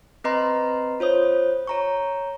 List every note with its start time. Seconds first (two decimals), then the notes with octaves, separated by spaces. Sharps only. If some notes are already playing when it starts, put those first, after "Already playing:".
0.24 C4 B4 D#5 A#5 C6
1.00 F4 C5 C#5 D#6
1.67 C#5 A#5 C#6